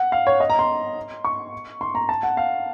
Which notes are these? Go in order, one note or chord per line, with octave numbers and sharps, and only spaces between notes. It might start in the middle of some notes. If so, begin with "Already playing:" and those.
Already playing: F#5
F5
C#5
D#5
A#5
C6
C#6
C6
A#5
A5
F#5
F5